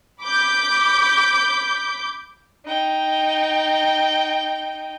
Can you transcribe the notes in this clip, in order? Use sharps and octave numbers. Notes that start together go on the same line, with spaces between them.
B5 D6 G6
D#4 G5